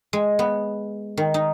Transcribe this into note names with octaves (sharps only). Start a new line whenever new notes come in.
G#3
B3
D#3
D#4